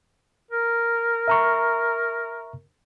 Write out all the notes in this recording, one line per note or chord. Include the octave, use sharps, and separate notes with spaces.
A#4
E5 A#5 C#6